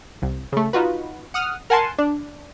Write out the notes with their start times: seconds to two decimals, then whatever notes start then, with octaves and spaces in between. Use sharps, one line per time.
0.22 C2
0.52 C#3 A3
0.73 D#4 F4 F#4 B4
1.34 F#5 D#6 F6
1.70 A#4 F#5 G#5 A5 C6
1.98 D4